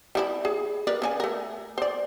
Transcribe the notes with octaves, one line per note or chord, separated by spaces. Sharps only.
G3 E4 B5
G#4
A#4 B4 D5
C#3 D#4 G#5
A3 A#4
C5 D5